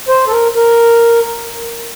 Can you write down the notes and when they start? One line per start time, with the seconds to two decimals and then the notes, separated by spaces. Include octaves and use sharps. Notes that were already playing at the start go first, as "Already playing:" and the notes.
0.08 C5
0.27 A4
0.32 A#4
0.55 A#4